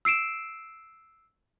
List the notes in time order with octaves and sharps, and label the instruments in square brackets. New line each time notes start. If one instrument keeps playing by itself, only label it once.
[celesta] E6 C7 D7 E7